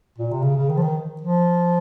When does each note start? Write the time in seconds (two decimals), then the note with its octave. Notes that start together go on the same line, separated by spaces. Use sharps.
0.18 A#2
0.31 C3
0.42 C#3
0.56 C#3
0.69 D#3
0.77 F3
0.82 D#3
1.21 F3